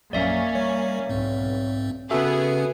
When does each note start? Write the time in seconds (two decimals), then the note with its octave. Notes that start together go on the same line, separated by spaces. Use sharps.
0.13 A#1 F#2 A#3 C#4 D5 E5 F5
0.55 G3 C#5
1.09 B1 G#2 C4
2.11 C#3 B3 C#4 F#4 G#4 A4 E5